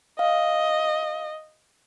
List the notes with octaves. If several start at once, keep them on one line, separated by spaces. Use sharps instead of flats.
D#5 F5